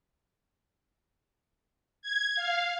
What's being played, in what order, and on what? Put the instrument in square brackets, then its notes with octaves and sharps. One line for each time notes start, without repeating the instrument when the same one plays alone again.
[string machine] G#6
F5